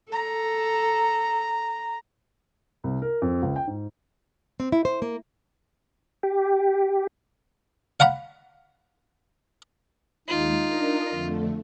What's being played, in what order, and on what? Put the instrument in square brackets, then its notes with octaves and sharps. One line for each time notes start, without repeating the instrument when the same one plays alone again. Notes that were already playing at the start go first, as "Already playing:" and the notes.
[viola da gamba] A4 [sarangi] A#5
[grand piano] C2
A#4
F2
C#2
G5
G#2
[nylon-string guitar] C4
E4
C5
A#3
[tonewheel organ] G4
[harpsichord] F5 F#5 A#5 B5
[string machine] D#2 G#3 [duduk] D#4 [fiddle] F4
[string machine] D4 A#4 D#5
F2 D3 A3